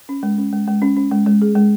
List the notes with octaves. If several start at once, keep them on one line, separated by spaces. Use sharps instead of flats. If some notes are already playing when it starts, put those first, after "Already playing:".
C#4
G#3
C#4
G#3
G#3
C#4
C#4
G#3
G#3
G#4
G#3